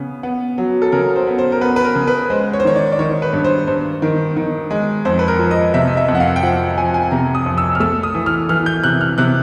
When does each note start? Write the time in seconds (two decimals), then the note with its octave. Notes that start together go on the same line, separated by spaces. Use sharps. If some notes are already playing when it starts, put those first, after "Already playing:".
Already playing: C#3 B3
0.23 B3
0.58 F#3
0.82 A4
0.92 C#3 A#4
1.16 C5
1.27 B3
1.38 C5
1.52 A#4
1.61 B3 B4
1.76 B4
1.84 A#4
1.95 C#3
2.07 B4
2.30 G#3 C5
2.53 C#5
2.60 C5
2.65 D#3 C#5
2.76 D5
2.92 D5
2.99 D#3 C#5
3.22 B4
3.33 G2
3.44 C5
3.67 G2 C5
4.02 D#3
4.36 D#3
4.71 G#3
5.05 F2 C5
5.19 B4
5.28 A#4
5.39 F3
5.51 D#5
5.74 C3 E5
5.87 D#5
5.97 E5
6.08 F2
6.15 F#5
6.20 F5
6.36 G5
6.43 F3 F#5
6.77 F3 G#5
6.94 G#5
7.11 C3 A#5
7.35 D#6
7.46 F2
7.58 E6
7.75 F6
7.80 A3 E6
8.03 D#6
8.15 E3
8.26 F6
8.49 E3 F6
8.66 G6
8.83 C3 F#6
9.01 F6
9.18 C3 F#6